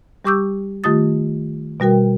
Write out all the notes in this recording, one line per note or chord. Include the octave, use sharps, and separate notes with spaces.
G3 G4 C#6 D6 E6 G6
D#3 A3 F4 G4 D#6 A6
B2 G3 F#4 A#4 G5